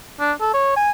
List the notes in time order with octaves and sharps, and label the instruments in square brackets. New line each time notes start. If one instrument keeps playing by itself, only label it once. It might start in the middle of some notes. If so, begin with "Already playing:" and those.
[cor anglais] D4
A4
C#5
G#5